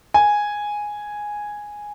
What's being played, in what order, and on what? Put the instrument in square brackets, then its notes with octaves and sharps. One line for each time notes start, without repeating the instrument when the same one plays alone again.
[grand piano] G#5